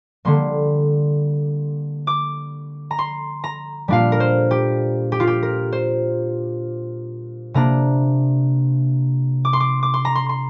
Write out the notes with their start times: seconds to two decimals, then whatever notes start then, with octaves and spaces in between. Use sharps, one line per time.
0.25 D3 G3 A#3 C6
2.07 D6
2.91 A#5
2.99 C6
3.44 A#5
3.88 A#2 G3 A#3 D4 F4 F5
4.12 A#4
4.20 C5
4.51 G4
5.12 G4
5.20 F4
5.27 G4
5.43 A#4
5.72 C5
7.54 C3 A#3 D4 A#5
9.45 D6
9.53 C6
9.60 D6
9.83 D6
9.94 C6
10.05 A#5
10.15 C6
10.29 C6